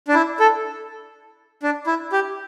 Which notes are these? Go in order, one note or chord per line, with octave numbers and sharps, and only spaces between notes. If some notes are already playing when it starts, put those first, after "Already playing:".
D4
E4
A4
D4
E4
G4